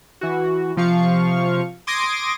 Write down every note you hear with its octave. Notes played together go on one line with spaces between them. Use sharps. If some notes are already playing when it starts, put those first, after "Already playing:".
E3 F#4
C3 F3 F5 C#6
C6 D6 D#6 G#6 A#6 D7